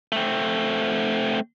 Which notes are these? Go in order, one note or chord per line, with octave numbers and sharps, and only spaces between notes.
A3 C4